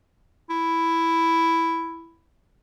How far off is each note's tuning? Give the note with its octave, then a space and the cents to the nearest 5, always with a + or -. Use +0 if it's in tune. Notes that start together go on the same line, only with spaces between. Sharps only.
E4 +5